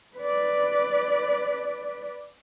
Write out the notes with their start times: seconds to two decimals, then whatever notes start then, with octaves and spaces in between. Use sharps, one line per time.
0.16 B4 D5